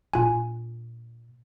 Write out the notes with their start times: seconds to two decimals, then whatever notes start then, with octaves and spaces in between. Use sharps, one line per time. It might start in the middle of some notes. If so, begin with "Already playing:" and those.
0.13 A#2 D4 F4 G#5